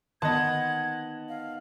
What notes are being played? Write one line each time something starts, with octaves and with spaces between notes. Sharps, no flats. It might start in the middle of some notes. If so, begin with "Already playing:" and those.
D#3 B3 D#5 F#5 A5 C6 G#6
F5